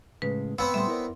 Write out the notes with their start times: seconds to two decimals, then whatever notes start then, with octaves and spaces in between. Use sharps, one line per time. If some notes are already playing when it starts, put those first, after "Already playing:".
0.22 A2 C#3 G#3 B4
0.58 B3 C4 F5 A5 B5 E6
0.74 A#2 G3 A3 E5 C6
0.88 E4 A#4 D5